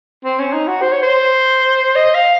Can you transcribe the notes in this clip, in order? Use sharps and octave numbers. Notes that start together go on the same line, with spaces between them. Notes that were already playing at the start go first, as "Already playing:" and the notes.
C4
C#4
D#4
F#4
C5
C#5
C5
D#5
F5